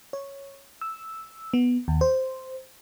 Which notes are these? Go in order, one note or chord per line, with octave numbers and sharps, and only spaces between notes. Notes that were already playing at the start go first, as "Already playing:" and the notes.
C#5
E6
B3
D#2
C5